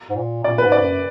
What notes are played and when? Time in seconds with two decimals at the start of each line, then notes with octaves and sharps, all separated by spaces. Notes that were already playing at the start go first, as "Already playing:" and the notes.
0.10 G#2
0.16 A#2
0.44 A#2 D5
0.58 G#2 B4
0.72 D5
0.82 F#2